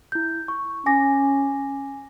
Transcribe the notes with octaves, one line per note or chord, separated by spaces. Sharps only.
E4 G6
C#6
C#4 G#5 D6 A#6